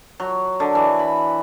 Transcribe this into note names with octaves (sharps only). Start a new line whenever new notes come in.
F#3
D3
E3
B5